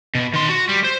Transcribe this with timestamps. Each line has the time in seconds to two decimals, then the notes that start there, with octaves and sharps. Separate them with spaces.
0.15 B2
0.34 D#3 C6
0.49 F#4
0.69 G3
0.85 C5